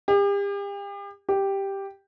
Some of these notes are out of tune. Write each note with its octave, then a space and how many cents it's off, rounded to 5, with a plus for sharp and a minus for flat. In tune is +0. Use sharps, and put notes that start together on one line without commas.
G4 +40
G4 +0